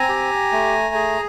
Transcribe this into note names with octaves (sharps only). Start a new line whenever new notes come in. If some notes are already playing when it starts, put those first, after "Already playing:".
Already playing: C4 G#5 A#5
G4
A3
G#4